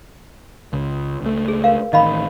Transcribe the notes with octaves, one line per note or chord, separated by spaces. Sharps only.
C#2
C#2 A3
G#4
A#4 F5
A1 D#3 D#5 F5 B5